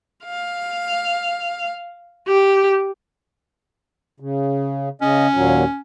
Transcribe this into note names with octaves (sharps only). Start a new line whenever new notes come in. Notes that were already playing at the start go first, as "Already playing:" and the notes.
F5
G4
C#3
C#3 C#4 D#5
D#2 A#2 F#3